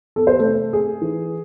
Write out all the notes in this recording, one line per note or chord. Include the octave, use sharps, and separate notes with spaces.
E2 A4
C5
C3 A3 A4
A3 G#4
E3